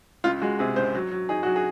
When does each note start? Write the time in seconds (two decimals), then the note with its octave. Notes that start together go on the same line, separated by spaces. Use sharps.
0.24 C#2 F4
0.42 G#3 F#4
0.59 C3 G#4
0.76 C#2 C5
0.95 F#3
1.11 F#3
1.29 D#4 G#4
1.43 F#3 F#4
1.56 G#4